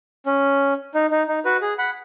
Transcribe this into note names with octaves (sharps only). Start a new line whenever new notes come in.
C#4
D#4
D#4
D#4
F#4 B4
G#4
F#5 B5